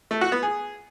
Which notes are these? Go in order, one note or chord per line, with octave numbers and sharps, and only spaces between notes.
A3
F#4
B3
G#4